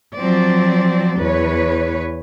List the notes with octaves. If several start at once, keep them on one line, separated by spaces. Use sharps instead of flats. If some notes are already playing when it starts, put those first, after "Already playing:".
F3 F#3 C4 D5
E2 B4 C#5